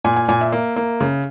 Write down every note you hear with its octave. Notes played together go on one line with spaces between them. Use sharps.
A#2 G#5
G#5
A#2 G#5
E5
A#3
A#3
C#3